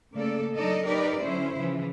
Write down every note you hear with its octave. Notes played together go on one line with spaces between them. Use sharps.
C#3 A3 A#3 A4 D5
F#3 D4 D#4 A4 D5 D#5
D#4 G4 A#4 B4 D5
D3 F#3 C#4 E4 C5
C#3 E3 F3